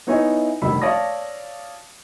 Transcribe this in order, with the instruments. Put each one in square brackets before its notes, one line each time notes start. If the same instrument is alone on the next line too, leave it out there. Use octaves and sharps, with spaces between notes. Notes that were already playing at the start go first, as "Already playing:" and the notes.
[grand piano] B3 D#4 E4 C#5 E5 G#5
F1 G2 D#3 B5 E6
C#5 D5 F5 A5 D#6 A#6